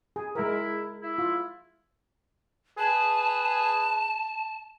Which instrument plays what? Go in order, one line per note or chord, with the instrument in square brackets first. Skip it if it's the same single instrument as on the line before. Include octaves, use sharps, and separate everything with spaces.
[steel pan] G#4
[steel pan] G#3 A#4 [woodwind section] E4
[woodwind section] E4
[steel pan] F4
[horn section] G#4 B4 [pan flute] A5